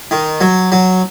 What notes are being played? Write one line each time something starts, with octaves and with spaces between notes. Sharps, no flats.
D#3
F#3
F#3